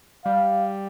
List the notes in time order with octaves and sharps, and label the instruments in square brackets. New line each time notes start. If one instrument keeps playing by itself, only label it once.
[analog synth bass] G3 [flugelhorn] F5